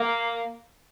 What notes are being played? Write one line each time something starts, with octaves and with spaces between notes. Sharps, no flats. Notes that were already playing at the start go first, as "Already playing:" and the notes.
Already playing: A#3